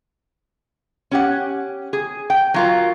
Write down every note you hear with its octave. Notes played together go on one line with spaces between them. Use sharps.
C#4 G4 F#5
G#4
G5
F#3 F4 A#4